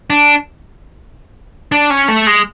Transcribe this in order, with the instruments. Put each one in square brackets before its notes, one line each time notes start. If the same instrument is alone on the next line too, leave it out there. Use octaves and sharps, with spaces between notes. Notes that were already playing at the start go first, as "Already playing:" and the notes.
[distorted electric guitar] D4
D4
C#4
A3
G#3